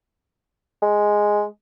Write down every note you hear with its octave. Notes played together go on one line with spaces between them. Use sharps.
G#3